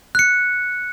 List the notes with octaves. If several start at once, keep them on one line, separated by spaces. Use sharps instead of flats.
F#6 C#7